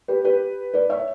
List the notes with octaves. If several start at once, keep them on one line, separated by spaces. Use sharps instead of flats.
G4 B4
G4 B4
B4 D5
C#5 E5